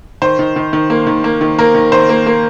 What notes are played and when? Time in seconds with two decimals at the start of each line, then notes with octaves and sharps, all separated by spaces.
0.22 D#3 C5
0.39 D#3
0.56 D#3
0.73 D#3
0.90 A#3
1.07 D#3
1.24 A#3
1.41 D#3
1.59 A#3 A#4
1.75 D#3
1.92 D#3 C5
2.09 A#3
2.26 A#3